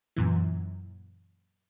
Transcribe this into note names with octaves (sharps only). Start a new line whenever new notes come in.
F#2 A#2 E3